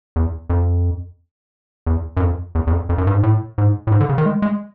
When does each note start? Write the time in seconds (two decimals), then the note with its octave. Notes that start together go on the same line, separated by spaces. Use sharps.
0.16 E2
0.50 F2
1.87 E2
2.17 F#2
2.21 F2
2.55 E2
2.67 E2
2.72 F2
2.89 F2
2.98 F#2
3.07 G2
3.14 G#2
3.23 A2
3.58 G#2
3.87 A2
3.92 G#2
4.00 D3
4.09 C#3
4.18 D#3
4.26 G#3
4.42 G#3